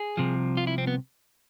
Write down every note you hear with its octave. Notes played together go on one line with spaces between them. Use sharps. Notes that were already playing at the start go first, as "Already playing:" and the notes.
Already playing: G#4
C2 C3 F3
F4
E4
C4
B3